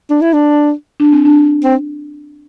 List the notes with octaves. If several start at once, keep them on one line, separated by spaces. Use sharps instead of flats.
D4
E4
D4
D4
C4
D4
C4